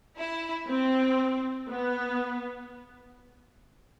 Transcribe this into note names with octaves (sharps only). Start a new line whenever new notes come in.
E4
C4
B3